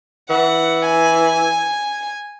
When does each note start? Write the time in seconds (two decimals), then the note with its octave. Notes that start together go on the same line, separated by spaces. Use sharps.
0.30 E3 F#5
0.85 G#5